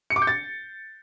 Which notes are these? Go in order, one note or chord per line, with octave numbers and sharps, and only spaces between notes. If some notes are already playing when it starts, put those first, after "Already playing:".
C#7
D6
G6
A6